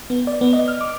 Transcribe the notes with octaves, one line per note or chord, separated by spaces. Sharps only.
B3
D5
B3
D#5
F6
D6